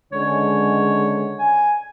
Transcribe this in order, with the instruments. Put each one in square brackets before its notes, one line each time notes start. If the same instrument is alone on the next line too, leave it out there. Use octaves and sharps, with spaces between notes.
[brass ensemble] C#2 D3 G#3 [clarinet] C#5
[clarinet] G#5